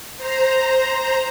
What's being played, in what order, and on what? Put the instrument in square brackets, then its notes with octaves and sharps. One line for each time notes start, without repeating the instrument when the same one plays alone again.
[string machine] C5 A#5